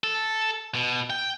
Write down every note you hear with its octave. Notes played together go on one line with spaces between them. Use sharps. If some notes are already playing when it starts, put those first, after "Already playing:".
A4
B2
G5